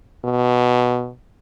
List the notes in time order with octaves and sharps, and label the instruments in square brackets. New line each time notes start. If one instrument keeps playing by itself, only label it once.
[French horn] B2